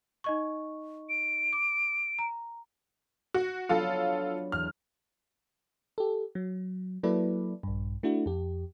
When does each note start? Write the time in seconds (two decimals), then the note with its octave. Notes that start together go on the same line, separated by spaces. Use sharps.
0.24 D#4 D#5 C#6
1.09 D7
1.53 D6
2.19 A#5
3.34 F#4
3.69 F#3 B3 D4 F4 A4
4.52 E2 F6
5.98 G4 A4
6.35 F#3
7.03 F#3 A#3 E4 A4 B4 D5
7.63 A#1 G2
8.03 A3 D4 E4 F#4
8.26 F2 G4